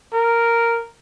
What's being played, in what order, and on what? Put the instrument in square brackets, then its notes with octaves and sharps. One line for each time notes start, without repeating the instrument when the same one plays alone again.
[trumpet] A#4